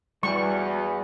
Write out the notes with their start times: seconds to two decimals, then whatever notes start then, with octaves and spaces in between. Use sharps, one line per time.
0.23 E2 G3 F#4 D5 C#6